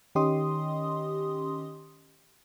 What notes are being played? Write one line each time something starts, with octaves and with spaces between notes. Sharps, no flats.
D#3 C#4 G4 D#5 C6 D#6